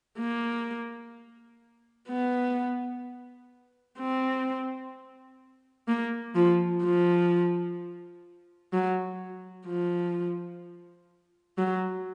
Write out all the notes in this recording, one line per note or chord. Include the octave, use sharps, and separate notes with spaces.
A#3
B3
C4
A#3
F3
F3
F#3
F3
F#3